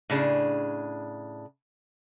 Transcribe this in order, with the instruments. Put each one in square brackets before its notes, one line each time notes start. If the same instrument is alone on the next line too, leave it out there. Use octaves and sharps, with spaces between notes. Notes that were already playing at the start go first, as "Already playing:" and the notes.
[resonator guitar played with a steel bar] A2 C#3 D4 G#4